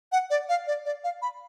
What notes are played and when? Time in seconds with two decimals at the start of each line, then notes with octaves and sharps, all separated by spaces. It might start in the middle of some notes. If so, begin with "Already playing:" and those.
0.12 F#5
0.30 D5
0.49 F5
0.67 D5
0.85 D5
1.04 F5
1.22 B5